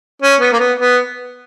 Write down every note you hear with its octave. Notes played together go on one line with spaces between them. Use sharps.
C#4
B3
A#3
B3
B3